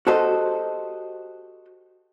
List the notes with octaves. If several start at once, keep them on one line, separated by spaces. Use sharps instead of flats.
F#4 G4 A4 C5 D#5